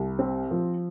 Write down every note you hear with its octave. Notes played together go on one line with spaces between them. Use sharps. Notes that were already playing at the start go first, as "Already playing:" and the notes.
Already playing: C2
C4
F3